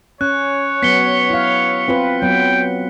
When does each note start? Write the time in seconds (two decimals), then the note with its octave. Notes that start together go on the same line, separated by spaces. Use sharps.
0.21 C#4 C#5 F#6
0.83 F#3 B3 B6 C#7 G7
1.30 E4 F5
1.88 C4 F4 B4
2.22 F#3 B3 G5